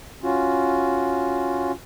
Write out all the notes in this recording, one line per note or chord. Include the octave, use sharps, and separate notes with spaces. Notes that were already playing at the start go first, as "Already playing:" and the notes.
C#4 F4 F#4